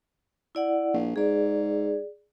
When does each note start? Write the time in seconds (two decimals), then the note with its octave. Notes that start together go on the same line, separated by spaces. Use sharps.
0.55 E4 D5 F#5
0.93 A#1
1.16 G#2 G#4 D5